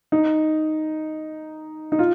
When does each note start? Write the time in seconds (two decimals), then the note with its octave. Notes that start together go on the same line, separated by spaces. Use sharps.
0.12 D#4
1.92 D#4
1.99 F4